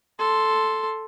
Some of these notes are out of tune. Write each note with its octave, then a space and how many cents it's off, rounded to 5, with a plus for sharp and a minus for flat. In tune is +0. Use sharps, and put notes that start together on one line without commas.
A4 +0 C6 +0